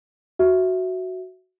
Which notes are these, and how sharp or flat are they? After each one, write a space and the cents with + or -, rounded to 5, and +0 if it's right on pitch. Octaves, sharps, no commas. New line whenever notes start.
F#4 +0 E5 +0